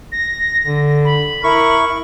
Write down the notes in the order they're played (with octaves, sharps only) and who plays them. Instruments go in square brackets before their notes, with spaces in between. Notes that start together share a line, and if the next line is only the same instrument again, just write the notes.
[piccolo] A#6
[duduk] D3
[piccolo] B5
[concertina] E4 C#6 [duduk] A#4